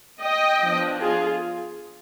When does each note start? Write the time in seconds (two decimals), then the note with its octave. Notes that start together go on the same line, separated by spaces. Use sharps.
0.21 D#5 G5
0.60 F3 B3 D4
0.99 F4 G#4